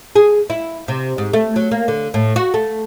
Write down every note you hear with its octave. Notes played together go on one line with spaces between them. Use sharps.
G#4
E4
C3
G#2
A3
F#3
A#3
D3
A2
F#4
A3